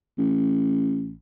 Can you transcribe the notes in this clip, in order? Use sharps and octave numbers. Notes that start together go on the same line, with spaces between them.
A1